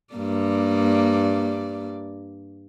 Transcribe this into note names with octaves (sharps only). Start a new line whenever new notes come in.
G2 A#3 D5